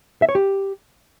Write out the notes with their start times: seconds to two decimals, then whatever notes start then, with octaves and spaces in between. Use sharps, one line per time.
0.22 E5
0.29 C#5
0.35 G4